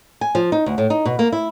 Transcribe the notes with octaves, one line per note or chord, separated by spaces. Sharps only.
G#5
F3
D#4
D2
A2
D#4
B2
A#3
E4